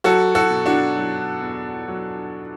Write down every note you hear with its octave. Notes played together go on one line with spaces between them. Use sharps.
F#3 F#4 A4
F#4 A4
B2
D4 F#4
F#3
E2
F#3